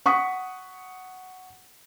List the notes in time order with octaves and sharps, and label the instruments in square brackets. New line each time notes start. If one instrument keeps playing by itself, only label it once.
[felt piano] F#5 C#6 D#6 B6